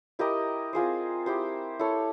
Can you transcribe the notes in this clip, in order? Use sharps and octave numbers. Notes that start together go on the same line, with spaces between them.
E4 G4 A#4 D#5
C4 F4 G#4 C5
E4 G4 C5
E4 A4 C#5